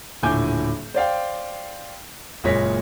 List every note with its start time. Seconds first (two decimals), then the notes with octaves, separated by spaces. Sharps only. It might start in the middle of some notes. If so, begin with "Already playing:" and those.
0.23 D#1 A2 D3 G#5 D6 G6
0.94 C5 D5 F5 G5
2.44 F#1 A#2 G#3 C#5 A#6 B6